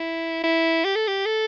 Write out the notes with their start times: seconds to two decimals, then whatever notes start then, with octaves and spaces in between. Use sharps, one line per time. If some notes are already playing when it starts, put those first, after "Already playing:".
Already playing: E4
0.44 E4
0.85 G4
0.96 A4
1.08 G4
1.26 A4